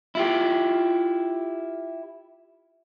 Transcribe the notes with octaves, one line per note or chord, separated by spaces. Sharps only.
E4 F4 G4